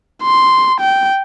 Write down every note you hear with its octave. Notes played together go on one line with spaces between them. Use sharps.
C6
G5